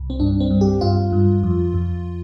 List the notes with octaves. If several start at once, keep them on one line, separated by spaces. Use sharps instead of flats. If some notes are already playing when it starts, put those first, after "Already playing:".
Already playing: C2
C4
G2 D4
C4
G2
G4
G2 F4
G2
F2
F2